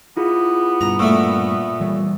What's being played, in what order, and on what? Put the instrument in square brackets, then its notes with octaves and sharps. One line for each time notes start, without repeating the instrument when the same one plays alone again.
[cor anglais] B3 [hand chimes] E4 F4 G#4
[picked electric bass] G2 B2 [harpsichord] A#5
[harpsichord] A#2 A3 [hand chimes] C#6 E6
[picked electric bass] A2 E3 G3